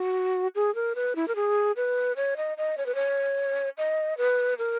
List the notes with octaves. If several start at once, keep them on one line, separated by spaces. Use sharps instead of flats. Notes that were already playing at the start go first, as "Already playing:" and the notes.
Already playing: F#4
G#4
A#4
B4
E4
A#4
G#4
B4
C#5
D#5
D#5
C#5
B4
C#5
D#5
B4
A#4